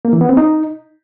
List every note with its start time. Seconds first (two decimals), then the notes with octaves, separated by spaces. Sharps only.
0.05 A#3
0.13 E3
0.21 B3
0.29 C4
0.37 D#4